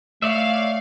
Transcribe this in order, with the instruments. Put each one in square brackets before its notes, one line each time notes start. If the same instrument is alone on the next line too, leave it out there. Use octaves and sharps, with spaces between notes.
[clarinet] A3 [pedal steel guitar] C#5 D5 E5 [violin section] F5